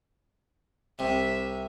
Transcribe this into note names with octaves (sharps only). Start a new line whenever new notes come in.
C2 C3 E5